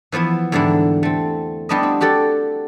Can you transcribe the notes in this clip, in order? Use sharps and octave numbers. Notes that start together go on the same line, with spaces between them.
E3 F3 B3 E4
E2 G#2 D3 G3 D4 E4
A3 C4
G3 B3 D4 E4 D#5
C4
F#4 G4 A4 D5 F#5